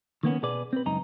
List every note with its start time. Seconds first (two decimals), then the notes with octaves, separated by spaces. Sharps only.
0.23 D#3 A#3 B3 C#4
0.43 B2 G#4 B4 D5
0.73 C4 B4
0.86 C#2 F#2 D#4 A#5